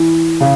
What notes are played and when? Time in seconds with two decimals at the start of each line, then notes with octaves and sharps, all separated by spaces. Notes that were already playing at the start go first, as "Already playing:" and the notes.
Already playing: E3
0.40 C#3